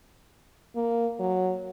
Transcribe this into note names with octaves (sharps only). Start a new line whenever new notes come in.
A#3
F#3